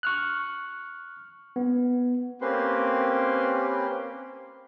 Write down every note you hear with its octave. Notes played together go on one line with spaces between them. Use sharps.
C#6 F6 F#6
B3
A#3 C4 C#4 G4 B4 C6